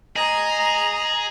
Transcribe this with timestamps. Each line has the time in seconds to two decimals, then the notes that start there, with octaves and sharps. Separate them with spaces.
0.16 G#4 D#5 A#5